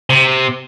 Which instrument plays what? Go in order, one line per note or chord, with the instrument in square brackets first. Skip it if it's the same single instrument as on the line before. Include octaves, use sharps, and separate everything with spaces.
[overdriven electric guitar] C3